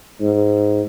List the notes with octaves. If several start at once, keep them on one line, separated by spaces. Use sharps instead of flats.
G#2